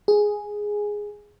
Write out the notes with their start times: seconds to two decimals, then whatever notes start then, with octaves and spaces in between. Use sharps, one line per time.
0.08 G#4